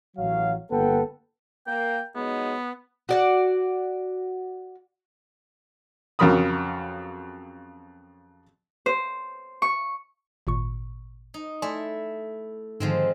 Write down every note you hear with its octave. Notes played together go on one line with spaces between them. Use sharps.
A1 F#3 F5
G1 A#3 A4 B4 F#5 G5
A#3 G5
F#3 G#3 B3 D#4
F#4 D5 F#5
F2 C#3 F#3 A#4 B5 D#6
C5
C#6
G#1 A#2 C#6
D#4
A3 E4 D5 G#5 C6
G#2 D3 D#3 F3 G#3 C4